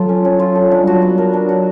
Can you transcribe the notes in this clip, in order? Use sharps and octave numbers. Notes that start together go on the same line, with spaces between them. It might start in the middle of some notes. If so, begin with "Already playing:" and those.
Already playing: F#3 F4 A4
C#4
C#4
F4
A4
F#3 D4
G3 F#4
F#3
B3
A#4
D4
F#4